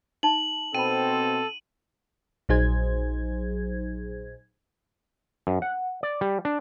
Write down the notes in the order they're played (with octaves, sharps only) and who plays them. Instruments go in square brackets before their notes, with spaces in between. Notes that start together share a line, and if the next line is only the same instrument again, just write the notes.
[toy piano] D#4 A5 [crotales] F#7
[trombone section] B2 C4 [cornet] A4 [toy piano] G5 B5 [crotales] D#7
[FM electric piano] A#1 F#3 D#4 G#4 C5 G#6
[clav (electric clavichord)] F#2
F#5
D5
G3
D4